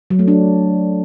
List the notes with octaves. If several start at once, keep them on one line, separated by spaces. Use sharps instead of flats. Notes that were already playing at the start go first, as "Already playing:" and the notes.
F#3
A3
D4